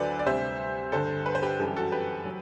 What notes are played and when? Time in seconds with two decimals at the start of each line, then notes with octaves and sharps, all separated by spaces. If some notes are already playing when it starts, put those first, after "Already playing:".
Already playing: D2 D3 F#3 A4 B4 C5 D5
0.19 D5
0.26 D2 C3 G3 C5 E5
0.92 G2 D3 G3 A4 C5
1.26 B4
1.35 C5
1.43 G4 B4
1.59 F#2 E3 G3 A4
1.68 G4
1.76 F#4 A4
1.92 G4 B4
2.25 F#3